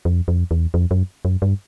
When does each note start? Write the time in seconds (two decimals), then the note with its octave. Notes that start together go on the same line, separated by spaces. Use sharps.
0.05 F2
0.28 F2
0.51 E2
0.74 F2
0.91 F#2
1.25 F#2
1.42 G2